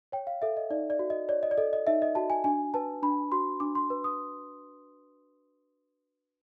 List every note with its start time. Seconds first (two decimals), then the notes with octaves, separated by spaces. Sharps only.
0.12 C#5 G5
0.27 F5
0.42 A4 E5
0.57 D#5
0.70 D#4 D5
0.90 D5
0.99 F#4
1.10 D#5
1.29 C#5 D5
1.43 D#5
1.51 D5
1.58 A4 D#5
1.73 D#5
1.87 D#4 E5
2.02 D#5
2.15 F#4 A5
2.30 G#5
2.44 D4 G#5
2.74 B4 A5
3.03 D4 B5
3.32 F#4 C6
3.60 D4 D6
3.75 C6
3.90 B4
4.04 D#6